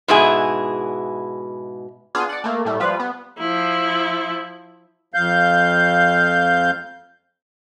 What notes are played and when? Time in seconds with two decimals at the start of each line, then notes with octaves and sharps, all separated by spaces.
0.08 G#2 B2 E4 G#4
2.15 B3 D4 F4 G#4
2.29 D5 F#5
2.44 A3 A#3
2.65 A2 G3 A3
2.80 F3 G3 F4 B4
3.00 B3
3.39 F3 E4
5.14 F2 F5 G6